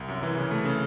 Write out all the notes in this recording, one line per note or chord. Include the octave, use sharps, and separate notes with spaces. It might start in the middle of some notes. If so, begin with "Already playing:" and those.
Already playing: C2
F#2
E3
C#3
A3
C#3